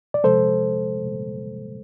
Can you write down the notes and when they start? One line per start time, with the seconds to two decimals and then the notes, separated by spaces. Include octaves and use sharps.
0.14 D5
0.24 C3 F3 G#3 A4 C5